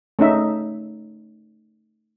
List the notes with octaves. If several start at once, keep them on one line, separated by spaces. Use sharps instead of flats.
A3 C#4 D#4 E5